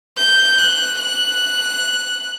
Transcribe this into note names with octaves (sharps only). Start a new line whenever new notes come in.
G6
F#6
F#6